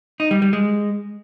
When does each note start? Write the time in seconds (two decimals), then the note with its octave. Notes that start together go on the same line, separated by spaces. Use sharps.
0.20 D#4
0.31 G3
0.42 G3
0.53 G#3